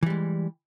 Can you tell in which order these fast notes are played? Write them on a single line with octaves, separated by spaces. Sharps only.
E3 G3 G#3